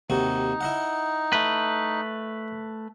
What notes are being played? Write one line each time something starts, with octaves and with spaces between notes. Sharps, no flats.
D#2 C3 D#4 F#4
E4 D#5 F#5
A3 B4